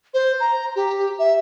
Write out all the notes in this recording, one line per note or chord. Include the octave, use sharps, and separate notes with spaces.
C5
A#5
G4
E5